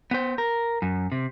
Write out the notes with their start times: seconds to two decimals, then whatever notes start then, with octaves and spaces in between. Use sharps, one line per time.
0.11 B3 C5
0.38 A#4
0.82 F#2
1.12 C3